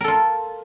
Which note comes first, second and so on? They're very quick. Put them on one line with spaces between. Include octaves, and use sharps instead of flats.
A#4 A4 F4